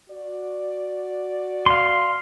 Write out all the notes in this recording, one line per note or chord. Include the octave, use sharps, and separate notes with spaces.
F#4 D5
F5 C6